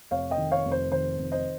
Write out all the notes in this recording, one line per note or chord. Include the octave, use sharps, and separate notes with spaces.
F1 C#5 F5
D#5 G5
D#3
C#5 F5
F1
C5
D#3 C5
F1
C5 D#5